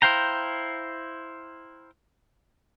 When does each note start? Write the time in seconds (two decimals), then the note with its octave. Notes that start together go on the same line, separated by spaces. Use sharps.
0.02 E4 C5 F5 G5 A#5